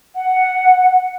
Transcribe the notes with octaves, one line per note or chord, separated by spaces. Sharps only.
F#5